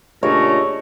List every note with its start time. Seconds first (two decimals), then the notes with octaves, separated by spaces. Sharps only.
0.23 A#2 C#3 A3 D4 G4 A#4 C#5 D#5